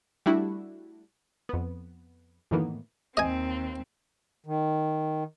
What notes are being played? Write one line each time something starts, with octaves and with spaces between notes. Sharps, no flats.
G3 A3 D4 E4 F#4
F2 B3
F#2 A2 D#3 E3 A#3 B3
D#2 C4 D#5 G#5
D#3